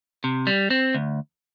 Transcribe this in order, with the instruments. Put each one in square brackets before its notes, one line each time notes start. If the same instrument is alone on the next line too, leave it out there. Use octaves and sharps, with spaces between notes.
[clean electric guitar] C3
G3
C4
D2